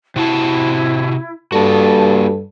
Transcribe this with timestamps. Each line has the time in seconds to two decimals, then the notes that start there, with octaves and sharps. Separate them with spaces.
0.16 C3 E4 F#4 A5
1.52 G2 A#3 F#4 A4 A5